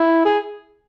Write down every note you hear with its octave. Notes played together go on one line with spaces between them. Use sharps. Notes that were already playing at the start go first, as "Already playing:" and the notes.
Already playing: E4
G#4